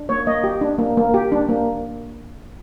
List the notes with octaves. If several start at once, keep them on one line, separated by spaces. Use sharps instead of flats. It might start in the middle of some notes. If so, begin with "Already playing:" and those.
Already playing: D4
A#3 C#5
A#3 D#5
G4
D4
A#3
A#3
G4
D4
A#3